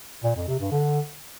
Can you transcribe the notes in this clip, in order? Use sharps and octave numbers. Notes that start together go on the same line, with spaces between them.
A#2
F2
C3
G2
D3